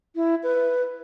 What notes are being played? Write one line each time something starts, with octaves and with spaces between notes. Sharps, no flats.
E4
B4